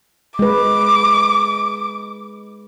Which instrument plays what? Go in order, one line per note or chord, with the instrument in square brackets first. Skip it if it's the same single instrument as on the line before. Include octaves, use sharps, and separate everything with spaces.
[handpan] G#3 B4 [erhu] D6